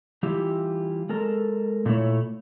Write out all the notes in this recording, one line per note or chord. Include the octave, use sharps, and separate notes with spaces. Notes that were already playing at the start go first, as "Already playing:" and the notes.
E3 G3 E4 F4 G4
G#3 A4 A#4
A#2 A3 C#4 E4 C#5